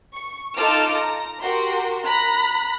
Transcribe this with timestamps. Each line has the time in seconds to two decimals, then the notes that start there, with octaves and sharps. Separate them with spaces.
0.15 C#6
0.57 D#4 F4 A4 A5 D6 F6
0.95 A#5
1.41 F#4 G4 A#4 C6
2.07 A#5 B5 F#6